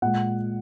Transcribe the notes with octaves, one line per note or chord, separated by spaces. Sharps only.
A#2 G#3 F#5